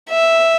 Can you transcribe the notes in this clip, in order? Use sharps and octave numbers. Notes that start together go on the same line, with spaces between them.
E5